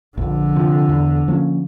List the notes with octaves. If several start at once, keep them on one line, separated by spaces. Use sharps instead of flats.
A#1 F2 D3
C3 F3
E2
F3 A#3 C#4